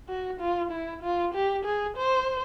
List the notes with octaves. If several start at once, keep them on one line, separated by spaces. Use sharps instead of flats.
F#4
F4
E4
F4
G4
G#4
C5